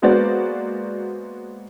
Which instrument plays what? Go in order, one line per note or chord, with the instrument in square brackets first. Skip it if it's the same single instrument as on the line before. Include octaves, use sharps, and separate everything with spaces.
[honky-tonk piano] G#3 A#3 B3 F#4 C5 D5